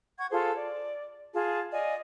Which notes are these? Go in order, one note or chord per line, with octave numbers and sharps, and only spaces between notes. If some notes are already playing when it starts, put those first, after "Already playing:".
F#5 C#6 G#6
F4 G#4 A4 C5
D5
F4 G#4 A5
D5 D#5 F5 G#5